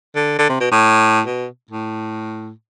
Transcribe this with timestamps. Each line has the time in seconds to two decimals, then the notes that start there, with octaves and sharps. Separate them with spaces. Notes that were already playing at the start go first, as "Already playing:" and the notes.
0.15 D3
0.39 D3
0.49 C3
0.60 B2
0.71 A2
1.26 B2
1.71 A2